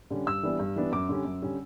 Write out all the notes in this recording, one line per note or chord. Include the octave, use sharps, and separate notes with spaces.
D3 G3 C#4
G2 E6
E3 G3 B3 D4
G2
E3 G3 B3 D4
F#2 D6
D3 G3 C#4
F#2
D3 G3 C#4